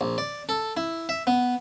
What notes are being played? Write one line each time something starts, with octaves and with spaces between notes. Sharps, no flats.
A#1
D5
A4
E4
E5
B3